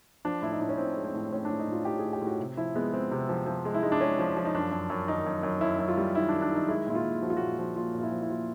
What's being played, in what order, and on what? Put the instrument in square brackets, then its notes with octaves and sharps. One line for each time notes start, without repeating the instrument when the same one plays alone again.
[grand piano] F3 D4
A2 E4
D#4
A2 D4
C#4
A2 C4
G#3
C4
A2
A2 C#4
D4
A2
D#4
A2
F4
A2 G4
G#4
A2
G4
A2
F#4
C3
F3 E4
G#3 B3
G#3 C4
C3
F3
F3
G#3
E4
G#3 D#4
D4
G#3 C#4
F3
F3
D#4
F#2 D4
F#2
F#2
D#3 D#4
F#2
F#2
F#2 E4
F#2
F4
G3
D#3 E4
D#3 D4
D4
D#3 D#4
G#3 E4
A#2 E4
F4
A#2
F3 F#4
F4
A#2 F#4
F3
A#2 F4
A#2 F4
E4
F3
E4
A#2 F4